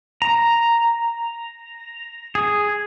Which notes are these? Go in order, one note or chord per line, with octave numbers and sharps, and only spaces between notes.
A#5
G#4